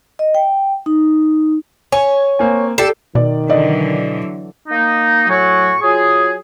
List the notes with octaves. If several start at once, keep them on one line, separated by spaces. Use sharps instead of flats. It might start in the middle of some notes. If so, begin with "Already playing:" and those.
D#5
G5
D#4
C#5 G#5
A#3 C4 G#5
G4 A4 D5 C7
B2 D#3 D5
D3 E3 F#3 D5 D#5
A#3 D#4
A2 F#3 F#4 G#5 C#6
F#3 F4 G#4